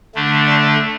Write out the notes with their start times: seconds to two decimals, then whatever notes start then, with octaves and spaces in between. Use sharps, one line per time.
0.15 D3 A3 D4
0.46 D5